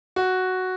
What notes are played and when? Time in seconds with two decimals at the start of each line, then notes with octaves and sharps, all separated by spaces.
0.16 F#4